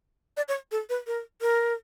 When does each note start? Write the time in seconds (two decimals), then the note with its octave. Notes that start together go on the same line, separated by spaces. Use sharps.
0.37 D5
0.48 C#5
0.71 A4
0.89 B4
1.07 A#4
1.41 A#4